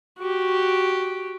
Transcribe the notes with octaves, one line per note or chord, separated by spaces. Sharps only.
F#4 G4